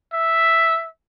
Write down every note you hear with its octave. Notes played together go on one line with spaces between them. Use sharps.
E5